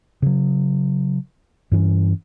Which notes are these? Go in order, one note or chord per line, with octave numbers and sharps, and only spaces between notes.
C#3 F#3
G2 E3 C#4